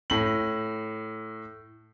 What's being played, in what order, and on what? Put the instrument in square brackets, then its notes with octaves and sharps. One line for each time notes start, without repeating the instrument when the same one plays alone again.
[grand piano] A2 F#7